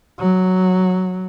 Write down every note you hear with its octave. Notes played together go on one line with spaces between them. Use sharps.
F#3